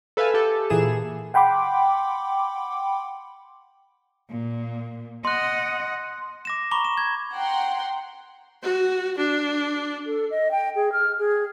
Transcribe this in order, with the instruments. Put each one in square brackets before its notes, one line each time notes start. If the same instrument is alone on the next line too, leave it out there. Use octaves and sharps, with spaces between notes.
[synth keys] A4 B4 E5 F5 G#5
G4 A4
A#2 E3 G#4 E7
[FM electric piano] F#5 G5 B5 C6 D6
[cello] A#2
[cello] D#5 F#5 [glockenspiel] C6 F#6
[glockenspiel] D6 A#6 E7
A#5 B5 C#6 D6 G7
E7
G#6
[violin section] F#5 G5 A#5 C6
[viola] F#4
D4
[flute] A4
D#5
G5
G#4
F6
G#4